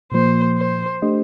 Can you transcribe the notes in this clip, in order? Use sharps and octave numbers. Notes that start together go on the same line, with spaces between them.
A#2 F3 A#3 C5
C5
A3 D4 G4 C5 D#5